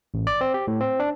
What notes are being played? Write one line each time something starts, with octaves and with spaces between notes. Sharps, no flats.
A1
D5
C4
G4
A2
C4
D4